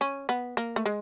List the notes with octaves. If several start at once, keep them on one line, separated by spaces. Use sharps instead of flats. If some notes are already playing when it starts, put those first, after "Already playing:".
C#4
B3
A#3
A3
G#3